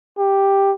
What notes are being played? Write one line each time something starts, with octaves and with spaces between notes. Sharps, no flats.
G4